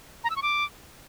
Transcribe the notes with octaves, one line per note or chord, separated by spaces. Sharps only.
A#5
E6
C#6
D6